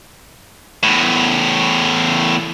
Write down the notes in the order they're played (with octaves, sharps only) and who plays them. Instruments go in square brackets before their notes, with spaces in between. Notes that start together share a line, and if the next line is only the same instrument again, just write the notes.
[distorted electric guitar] E2 A2